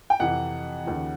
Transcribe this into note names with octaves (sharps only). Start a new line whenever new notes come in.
G5
F2 C3 E3 F#5
D#2 C#3 F3